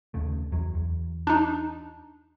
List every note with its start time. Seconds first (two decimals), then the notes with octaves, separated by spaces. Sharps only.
0.14 D#2 C#3 A3
0.52 E2 F#3
0.75 E2
1.27 D4 D#4